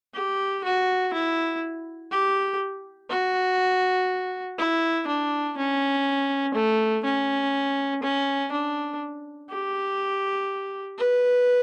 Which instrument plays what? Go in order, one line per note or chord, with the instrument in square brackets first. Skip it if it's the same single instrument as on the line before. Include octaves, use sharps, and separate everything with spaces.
[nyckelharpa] G4
F#4
E4
G4
F#4
E4
D4
C#4
A3
C#4
C#4
D4
G4
B4